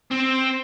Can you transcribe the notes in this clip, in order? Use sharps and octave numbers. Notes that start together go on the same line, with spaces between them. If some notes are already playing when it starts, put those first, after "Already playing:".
C4